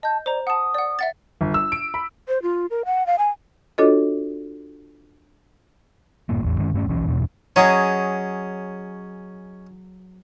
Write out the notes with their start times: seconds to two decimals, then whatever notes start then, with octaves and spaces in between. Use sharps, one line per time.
0.03 D#5 A5 G6
0.26 C5 D5 A#5
0.47 F#5 A5 D#6
0.74 D5 F#5
0.99 E5 F#5 A6
1.41 G1
1.54 E6
1.72 D7
1.94 B5
2.28 C5
2.42 F4
2.70 A#4
2.85 F#5
3.07 F5
3.18 G#5
3.78 D4 F4 F#4 A4 C#5 D#5
6.29 D#1 G2 A#2 A#3
6.43 A1 E2 E3
6.58 G2 D#3 G#3 C#4
6.74 G2 A3 B3 C#4
6.87 D#1 B1 E3 C#4
7.07 E2 G2 B2
7.56 F#3 C#4 G#4 D#5